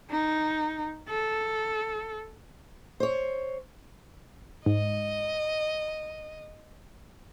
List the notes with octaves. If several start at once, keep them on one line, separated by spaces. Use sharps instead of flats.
D#4
A4
C5 C#5
G#2 D#5